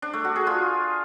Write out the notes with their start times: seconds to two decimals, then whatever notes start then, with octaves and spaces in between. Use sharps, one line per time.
0.02 D4
0.13 A3
0.25 F#4
0.36 G#4
0.47 F4